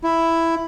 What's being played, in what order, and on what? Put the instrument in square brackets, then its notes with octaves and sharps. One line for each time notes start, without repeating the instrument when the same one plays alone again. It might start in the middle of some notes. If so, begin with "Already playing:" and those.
[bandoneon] E4